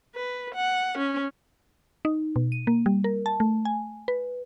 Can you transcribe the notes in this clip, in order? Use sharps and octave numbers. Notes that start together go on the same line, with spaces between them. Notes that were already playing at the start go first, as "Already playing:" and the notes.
B4
F#5
C#4
D#4
B2
D#7
A#3
G3
A#4
A5
A3
G#5
B4